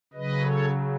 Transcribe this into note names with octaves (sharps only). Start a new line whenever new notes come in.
C#3 F#3 B4 D#5
A4 C#5